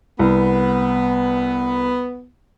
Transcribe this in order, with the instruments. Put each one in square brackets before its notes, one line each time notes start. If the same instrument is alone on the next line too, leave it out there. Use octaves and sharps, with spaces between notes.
[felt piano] C2 [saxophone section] B3